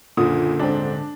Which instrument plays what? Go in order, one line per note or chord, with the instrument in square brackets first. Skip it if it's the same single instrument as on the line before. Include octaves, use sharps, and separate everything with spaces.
[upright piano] F#1 D#6 [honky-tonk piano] A#2 [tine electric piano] D3
[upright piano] D#1 G#2 C4 [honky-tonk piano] D4